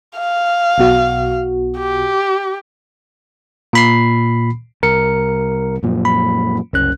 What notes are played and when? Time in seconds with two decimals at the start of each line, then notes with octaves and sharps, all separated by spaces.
0.19 F5
0.78 B1 B2 F#4
1.78 G4
3.73 A#2 B5 C7
4.83 C2 A#4 C#7
5.83 F#2 A#2 F3
6.05 B5
6.73 F#1 C2 C#4 F#6